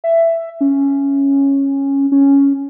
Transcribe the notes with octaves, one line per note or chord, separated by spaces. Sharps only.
E5
C#4
C#4